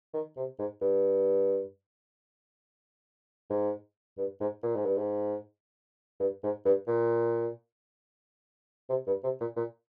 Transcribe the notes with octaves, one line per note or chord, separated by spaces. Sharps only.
D#3
C3
G#2
G2
G#2
G2
G#2
A#2
G#2
G2
G#2
G2
G#2
G2
A#2
C3
G2
C3
A#2
A#2